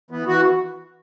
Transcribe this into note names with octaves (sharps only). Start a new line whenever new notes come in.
E3 B3
E3 F#4